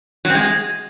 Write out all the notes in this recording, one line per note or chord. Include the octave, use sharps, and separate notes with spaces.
F#3
C4
G#3